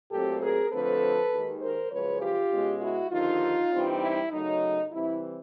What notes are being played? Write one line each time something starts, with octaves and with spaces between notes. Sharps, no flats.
A#2 F#3 A3 C4 G4 A4
G#4 A#4
D3 F3 A3 C4 A4 B4
D#2 D#3 G#3
A#4 C5
F#2 C#3 F3 G#3 B4 C#5
F4 G4
B2 G#3 C#4
E4 F#4
D#2 D3 F3 D#4 F4
G2 E3 G3 C4 D#4
E4
F#2 C#3 F#3 A3 D#4
C3 E3 G3 C4 E4